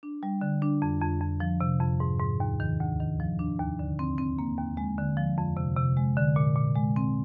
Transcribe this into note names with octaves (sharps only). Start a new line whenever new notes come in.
D4
G3
D3
D4
F2
F2
F2
F3
C3
F2
G#2
G#2
D#2
D#3
D2
D#3
F3
D4
D#2
D3
C4
C4
A#3
D#2
G#3
D3
F3
F2
C3
C3
G#3
D3
A#2
A#2
G#3
C4